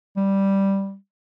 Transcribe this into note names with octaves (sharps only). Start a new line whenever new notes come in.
G3